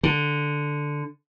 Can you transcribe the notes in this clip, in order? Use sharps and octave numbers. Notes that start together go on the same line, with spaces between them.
D3